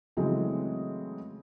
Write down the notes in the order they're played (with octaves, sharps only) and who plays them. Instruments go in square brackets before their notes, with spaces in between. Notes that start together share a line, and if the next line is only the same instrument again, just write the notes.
[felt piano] C#3 E3 F#3 G#3 A3 C4